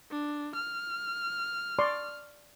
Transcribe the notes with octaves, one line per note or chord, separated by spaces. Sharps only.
D4
F6
D5 C6 C#6